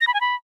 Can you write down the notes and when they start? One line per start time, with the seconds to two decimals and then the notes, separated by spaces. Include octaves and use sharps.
0.01 A#6
0.07 B5
0.14 G#5
0.21 B5